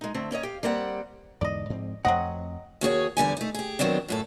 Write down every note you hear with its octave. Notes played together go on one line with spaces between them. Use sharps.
G#3 D#4
D3 A3 C4
A#3 C#4 C#5 D#5
G4 F5
G3 A#3 C4 D5 F#5
E2 G#2 D3 D5 D#5
G#2 F3 C4
F2 F3 F#3 A3 C4 D#5 F#5
D#2 F#4 G#4 C#5
E2 D3 G3 G#5
A3 D#4
G4 G#4
D#3 F#3 B3 C4 D4
F#2 A2 A4